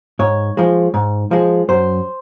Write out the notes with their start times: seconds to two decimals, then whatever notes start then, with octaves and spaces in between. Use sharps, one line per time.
0.19 G#2 C#5
0.57 F3 G#3
0.94 G#2
1.31 F3 G#3
1.69 F#2 C5